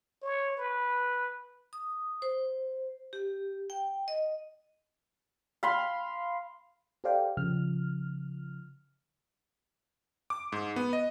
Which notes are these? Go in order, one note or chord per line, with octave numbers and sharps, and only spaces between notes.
C#5
B4
D#6
C5
G4
G5
D#5
F5 B5 C6
G4 A4 C5 D5 F5 G5
C#3 F3 F6
D6
G#2
B3
D#5